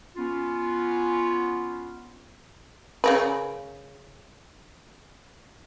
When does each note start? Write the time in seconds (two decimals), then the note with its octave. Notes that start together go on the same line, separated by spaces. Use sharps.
0.16 B3 C#4 F4
3.04 C#3 A#4 B4